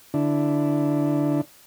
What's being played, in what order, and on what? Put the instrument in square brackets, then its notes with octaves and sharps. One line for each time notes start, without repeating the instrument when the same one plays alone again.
[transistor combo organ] D3 D4 E4